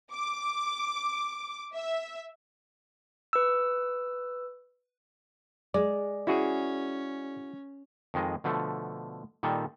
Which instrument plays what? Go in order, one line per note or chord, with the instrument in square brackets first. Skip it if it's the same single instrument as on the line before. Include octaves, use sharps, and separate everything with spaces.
[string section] D6
E5
[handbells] B4 E6
[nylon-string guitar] G#3 [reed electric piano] D5
[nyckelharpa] C#4 [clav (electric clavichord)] E4 F#4 G#4
[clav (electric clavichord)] F2 D#3 G#3 D#5
B2 D3 F3 A3
A#2 D#3 G3 A4